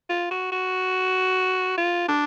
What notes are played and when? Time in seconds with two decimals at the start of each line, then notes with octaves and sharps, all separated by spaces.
0.10 F4
0.31 F#4
0.52 F#4
1.78 F4
2.08 D4